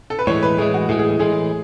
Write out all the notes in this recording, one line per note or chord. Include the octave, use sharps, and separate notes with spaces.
A4
B4
A2 E3 G#3 C#5
B4
A2 E3 G#3 G#4
F#4
A2 E3 G#3 G#4
G#4
G#4
A2 E3 G#3 G#4